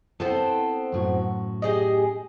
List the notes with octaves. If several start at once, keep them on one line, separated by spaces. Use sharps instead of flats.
B3 C4 E4 A4 C5
F#2 A2 F#4
G4 G#4 D#5